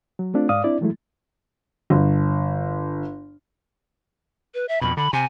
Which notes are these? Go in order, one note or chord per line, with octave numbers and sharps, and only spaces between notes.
F#3
A3 C4 D4 F4
G#2 D5 F5 D#6
C4 D4 E4 D5
E3 F#3 G#3 A3 E4
G1
B4
E5
F2 B2 B5
D3 B5
C3 G#5